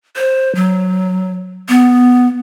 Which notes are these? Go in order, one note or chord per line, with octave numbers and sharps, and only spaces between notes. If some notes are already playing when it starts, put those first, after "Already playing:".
C5
F#3
B3